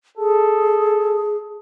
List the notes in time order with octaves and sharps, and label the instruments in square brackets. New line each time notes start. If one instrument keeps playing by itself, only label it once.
[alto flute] G#4 [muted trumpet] A4